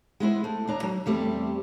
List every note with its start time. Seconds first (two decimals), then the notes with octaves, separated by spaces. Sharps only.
0.20 G#3 B3 E4 C5
0.44 A3
0.68 D#2 D4 A#5
0.83 F#3
1.06 E2 G3 A3 C4 G4